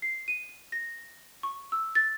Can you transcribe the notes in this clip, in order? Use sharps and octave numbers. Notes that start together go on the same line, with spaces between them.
C7
D#7
A#6
C#6
E6
A6